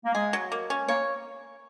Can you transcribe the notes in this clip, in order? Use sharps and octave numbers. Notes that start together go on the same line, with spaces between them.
A#3
G#3 G#4
F#3
A#3
C#4
A#3 C#5